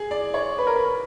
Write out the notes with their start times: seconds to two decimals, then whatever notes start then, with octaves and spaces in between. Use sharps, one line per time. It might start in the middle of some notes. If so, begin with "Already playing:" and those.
Already playing: G#4
0.11 D5
0.34 C#5
0.58 B4
0.67 A#4
0.76 B4